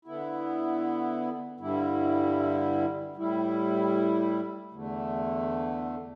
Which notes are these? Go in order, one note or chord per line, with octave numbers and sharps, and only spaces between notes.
D3 B3 E4
G2 D3 G3 E4
A2 G3 E4
E2 D3 A3